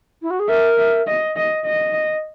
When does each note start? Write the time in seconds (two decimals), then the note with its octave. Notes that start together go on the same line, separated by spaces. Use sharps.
0.22 E4
0.30 F#4
0.40 G#4
0.48 A#4 E5
0.77 E5
1.07 D#5
1.36 D#5
1.66 D#5